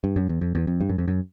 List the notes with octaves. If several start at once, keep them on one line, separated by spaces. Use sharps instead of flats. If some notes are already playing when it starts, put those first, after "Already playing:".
G2
F#2
E2
F2
E2
F2
G2
F#2
F2
F#2